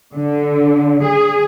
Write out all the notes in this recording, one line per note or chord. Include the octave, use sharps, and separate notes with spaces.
D3
G#4